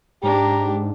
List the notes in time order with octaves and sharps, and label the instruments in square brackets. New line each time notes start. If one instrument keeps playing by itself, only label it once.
[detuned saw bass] G#2 [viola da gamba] D4 [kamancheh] G4 [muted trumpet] A#5